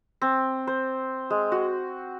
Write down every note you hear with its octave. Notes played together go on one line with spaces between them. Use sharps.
C4
C5
G#3
F#4